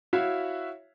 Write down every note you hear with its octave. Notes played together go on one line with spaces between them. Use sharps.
E4 F#4 C#5 E5 F5